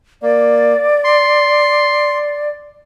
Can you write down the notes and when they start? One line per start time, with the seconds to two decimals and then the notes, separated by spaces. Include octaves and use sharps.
0.22 A#3 D5
1.04 C6